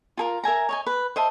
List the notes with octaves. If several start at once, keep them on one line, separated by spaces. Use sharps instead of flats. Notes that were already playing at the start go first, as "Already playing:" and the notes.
F4 G#4 A#4
A#4 E5 G#5 A#5
C#5 D#5 G#5
B4
C5 D#5 E5 A5